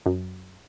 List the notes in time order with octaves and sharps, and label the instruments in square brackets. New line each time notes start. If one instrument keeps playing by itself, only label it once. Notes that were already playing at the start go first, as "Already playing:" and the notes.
[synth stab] F#2